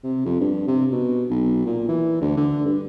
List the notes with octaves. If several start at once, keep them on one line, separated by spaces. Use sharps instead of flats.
C3
F2
G2
C3
B2
B1
A#2
E3
D2
D3
G2